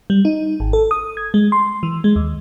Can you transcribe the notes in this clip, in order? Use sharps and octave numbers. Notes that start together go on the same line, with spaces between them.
G3
D#4
G#1
A4
D#6
G#6
G#3
C6
E3
G#3
D#2